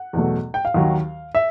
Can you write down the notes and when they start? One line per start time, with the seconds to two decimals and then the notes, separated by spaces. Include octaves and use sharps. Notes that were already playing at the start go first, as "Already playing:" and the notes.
Already playing: F#5
0.13 E2 B2 F#3 A3
0.54 G5
0.65 F5
0.74 D#2 D#3 F#3
1.35 E5